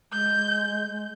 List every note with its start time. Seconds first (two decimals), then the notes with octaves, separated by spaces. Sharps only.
0.12 G#3 G6